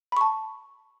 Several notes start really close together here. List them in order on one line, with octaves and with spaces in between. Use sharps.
B5 C#6 A5